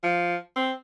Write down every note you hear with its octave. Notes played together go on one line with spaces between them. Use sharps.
F3
C4